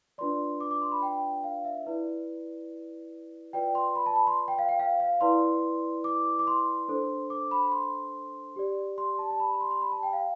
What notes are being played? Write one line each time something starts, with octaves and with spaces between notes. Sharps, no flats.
D4 F4 B4 D5 C6
D6
D6
C6
B5
G5
F5
E5
E4 B4 D5
F4 B4 D5 G5
C6
B5
A5
B5
C6
G5
F5
G5
F5
F5
E4 B4 D5 C6
D6
D6
C6
D4 A4 C5
D6
B5
C6
G4 D5
C6
A5
A5
B5
B5
C6
C6
B5
A5
G5
F5